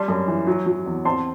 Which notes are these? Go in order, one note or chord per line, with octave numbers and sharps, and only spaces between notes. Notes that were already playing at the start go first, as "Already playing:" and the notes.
Already playing: G3 A5 C6
F#2
E3
F#3
F#3
E2
C4 A5 C6